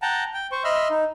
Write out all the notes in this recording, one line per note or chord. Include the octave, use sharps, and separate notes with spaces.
F#5 G5 A5 A#5
G5
C5 C#6
D#5 E5 B5 C6 E6 F6
D#4